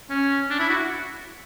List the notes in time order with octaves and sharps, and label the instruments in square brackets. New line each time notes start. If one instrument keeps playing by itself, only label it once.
[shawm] C#4
D4
E4
F#4